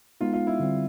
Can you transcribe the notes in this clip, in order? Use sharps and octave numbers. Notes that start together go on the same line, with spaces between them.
G#3 B3 D#4 F4
F4
E4
D3 G3 C4